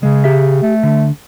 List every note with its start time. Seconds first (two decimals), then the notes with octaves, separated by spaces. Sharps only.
0.03 C#3 G#3
0.24 G4 E5
0.63 A3
0.83 D3